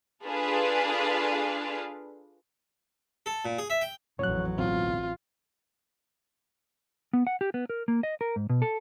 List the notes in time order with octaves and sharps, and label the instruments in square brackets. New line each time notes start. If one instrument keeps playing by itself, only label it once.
[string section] D4 F4 G#4 A4 B4 F5
[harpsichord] A4
A#2
G#4
E5
G5
[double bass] A1 F#3 [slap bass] F2 A2 [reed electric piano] C#5 F#6
[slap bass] D1 B1 E3 [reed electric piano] C4 [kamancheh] F4
[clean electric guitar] B3
F#5
G4
B3
A#4
A#3
D#5
A#4
G#2
B2
A4